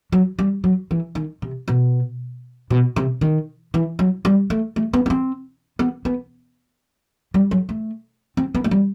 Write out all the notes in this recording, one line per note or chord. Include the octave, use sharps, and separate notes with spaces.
F#3
G3
F#3
E3
D#3
C3
B2
B2
C3
D#3
E3
F#3
G3
A3
A3
B3
B3
C4
B3
B3
G3
F#3
A3
C4
B3
A3
G3